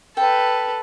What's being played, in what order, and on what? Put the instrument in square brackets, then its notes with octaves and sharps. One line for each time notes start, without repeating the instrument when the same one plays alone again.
[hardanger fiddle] A4 B4 [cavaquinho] G5